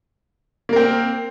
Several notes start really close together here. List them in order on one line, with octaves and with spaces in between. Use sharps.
A#3 A#4 C4